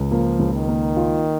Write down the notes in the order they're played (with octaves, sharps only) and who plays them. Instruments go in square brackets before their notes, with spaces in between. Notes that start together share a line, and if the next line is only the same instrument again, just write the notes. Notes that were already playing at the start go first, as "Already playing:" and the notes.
Already playing: [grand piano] C#2
[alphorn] F3 [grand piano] A#3
[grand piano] C#2
[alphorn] D#3
[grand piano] A#3
F4